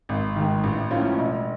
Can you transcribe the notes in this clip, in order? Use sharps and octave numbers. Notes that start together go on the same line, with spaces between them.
G#1
G#2 D#3
A1
A2 F3 A#3 C#4
E1